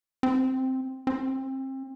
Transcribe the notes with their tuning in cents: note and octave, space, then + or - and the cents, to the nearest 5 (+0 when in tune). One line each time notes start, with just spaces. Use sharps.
C4 +0
C4 +30